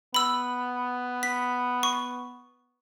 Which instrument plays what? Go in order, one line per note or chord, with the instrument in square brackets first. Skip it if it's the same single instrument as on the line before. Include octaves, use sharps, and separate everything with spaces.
[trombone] B3 [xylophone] B5 E6
[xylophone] B6
C#6